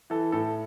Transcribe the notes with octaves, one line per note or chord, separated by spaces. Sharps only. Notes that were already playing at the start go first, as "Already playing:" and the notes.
E3 A4
A2 A4